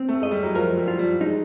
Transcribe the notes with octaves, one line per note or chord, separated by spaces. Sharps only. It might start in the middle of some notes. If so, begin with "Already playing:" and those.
Already playing: C4
A3
G#3 D#5
G3
F#3
F3 A#4
G3
F4
G3
G#3 D#4